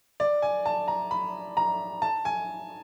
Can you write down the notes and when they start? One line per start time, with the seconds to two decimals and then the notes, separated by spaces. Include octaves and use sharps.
0.20 D5
0.42 G#5
0.66 A5
0.88 A#5
1.11 B5
1.57 A#5
2.02 A5
2.25 G#5